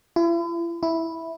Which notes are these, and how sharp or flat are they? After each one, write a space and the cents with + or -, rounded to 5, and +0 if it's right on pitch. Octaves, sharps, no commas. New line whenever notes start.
E4 +40
E4 -5